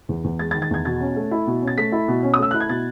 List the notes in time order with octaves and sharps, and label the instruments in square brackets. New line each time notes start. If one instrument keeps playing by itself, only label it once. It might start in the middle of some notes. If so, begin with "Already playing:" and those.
[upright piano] E2
E2
G#3 A6
A6
D#3
A6
E2 G#6
B2 A6
C#4
A3
E4
B2
C#4
A6
A3 B6
E4
B2
C#4
D#6
A3 E6
E4 F#6
G#6
B2 A6